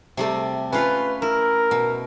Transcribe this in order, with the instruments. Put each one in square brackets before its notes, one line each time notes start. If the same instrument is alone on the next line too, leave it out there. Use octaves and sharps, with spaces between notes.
[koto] C3 G3 A3
[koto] C#4 F4 [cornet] B4
[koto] E4 [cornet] A#4
[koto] B2